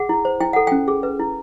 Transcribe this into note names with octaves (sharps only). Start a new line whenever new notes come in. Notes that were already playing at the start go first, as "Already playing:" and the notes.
Already playing: G#4 F#5
E4
C5
E4 G5
A4 F#5
C#4 G5
G#4
B4
E4